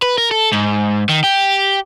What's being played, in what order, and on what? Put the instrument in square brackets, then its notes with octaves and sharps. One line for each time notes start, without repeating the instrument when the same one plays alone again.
[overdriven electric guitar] B4
A#4
A4
G#2
D#3
G4